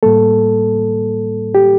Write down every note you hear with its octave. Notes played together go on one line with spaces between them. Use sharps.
A2 G3 A#3 A4
G4